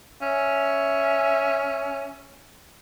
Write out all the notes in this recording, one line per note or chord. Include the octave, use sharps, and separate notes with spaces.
C#4 E5